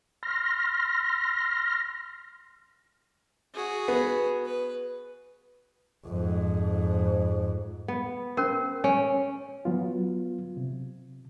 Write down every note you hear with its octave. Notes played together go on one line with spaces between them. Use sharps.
C6 F6 A#6
F#4 G#4
B3
B4
F2 G#2
B3
C#4 A#4 C5
C#4 G#5
F#3 B3 F4
C3